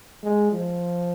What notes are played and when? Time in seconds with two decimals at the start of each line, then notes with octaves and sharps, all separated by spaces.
0.23 G#3
0.52 F3